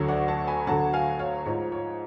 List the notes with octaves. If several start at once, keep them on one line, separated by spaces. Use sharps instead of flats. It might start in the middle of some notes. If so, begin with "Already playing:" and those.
Already playing: D2 D3 F#3
D5 F#5
F#5 A5
G#5 B5
D2 D3 F#3 F#5 A5
F5 G#5
C#5 F5
G#2 F3 C#5
C#5